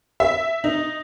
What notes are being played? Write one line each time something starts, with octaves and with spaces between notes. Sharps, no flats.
E5
D#4